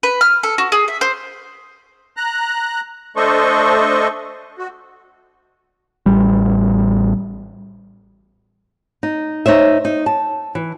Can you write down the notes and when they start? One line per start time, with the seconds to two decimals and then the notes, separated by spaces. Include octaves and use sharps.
0.03 B4
0.21 F6
0.43 A4
0.58 F#4
0.72 G#4
0.88 E5
1.01 C5
2.17 A#5 F#6
3.16 A3 D4 A4 C5 D#5 C#6
4.58 F#4
6.06 A1 G3
9.03 D#4
9.46 D#4 C5 C#5 E5
9.85 D#4
10.06 A5
10.55 E3